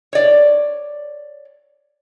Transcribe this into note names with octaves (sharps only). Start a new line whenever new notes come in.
C#5 D5